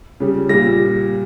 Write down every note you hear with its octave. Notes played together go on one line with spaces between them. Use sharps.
C#3 G3
A#2 G3 A#6